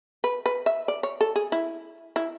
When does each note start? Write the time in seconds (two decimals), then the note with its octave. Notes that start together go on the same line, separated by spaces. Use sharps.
0.24 B4
0.46 B4
0.66 E5
0.88 D5
1.03 C#5
1.21 A4
1.36 G#4
1.52 E4
2.16 E4